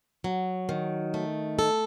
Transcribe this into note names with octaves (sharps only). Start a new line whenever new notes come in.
F#3
D#3
A3
A4